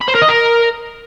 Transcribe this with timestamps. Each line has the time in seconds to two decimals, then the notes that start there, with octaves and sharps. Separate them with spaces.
0.01 B5
0.08 C5
0.15 A#4
0.22 D#5
0.29 A#4